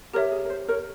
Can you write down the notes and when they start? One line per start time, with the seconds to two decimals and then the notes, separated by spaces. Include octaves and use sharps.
0.13 G4 A#4 C#5 E5
0.32 G#4
0.45 A#4
0.50 C5
0.68 A#4 C#5